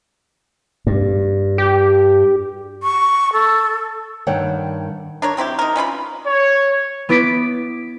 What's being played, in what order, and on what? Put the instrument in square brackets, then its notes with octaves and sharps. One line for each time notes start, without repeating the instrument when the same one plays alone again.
[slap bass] G2
[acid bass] G4
[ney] C#6
A4
[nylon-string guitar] G2 D#3 C#5 D5 F#5 G5
[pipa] D4 A#4 C#5
F#3 C4 E4 G4
D#4 A#4
E3 C#4 F4 B5
[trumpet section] C#5
[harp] B3 E4 D6 A6 B6 D7